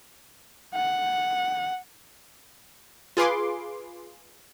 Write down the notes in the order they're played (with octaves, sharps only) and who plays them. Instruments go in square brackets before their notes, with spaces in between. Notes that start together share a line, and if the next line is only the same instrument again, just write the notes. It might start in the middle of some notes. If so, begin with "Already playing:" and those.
[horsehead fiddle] F#5
[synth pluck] F4 G#4 B4 C6 D6